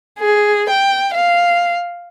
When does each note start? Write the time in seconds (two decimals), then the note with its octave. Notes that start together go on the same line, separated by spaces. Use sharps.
0.19 G#4
0.70 G5
1.14 F5